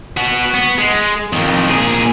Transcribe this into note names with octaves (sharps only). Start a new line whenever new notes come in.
B3 F#4
B3
G#3
F2 D#3
A#2 G#4